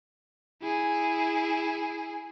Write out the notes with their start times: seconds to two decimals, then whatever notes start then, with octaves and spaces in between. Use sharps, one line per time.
0.62 E4 G#4